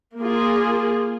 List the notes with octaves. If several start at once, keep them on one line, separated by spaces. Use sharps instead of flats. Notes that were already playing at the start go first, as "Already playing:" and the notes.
A#3 F4 G#4